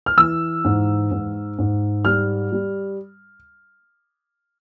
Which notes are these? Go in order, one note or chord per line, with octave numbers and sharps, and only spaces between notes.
F6
E3 E6
G#2
G#2
G#2
G3 F6
G3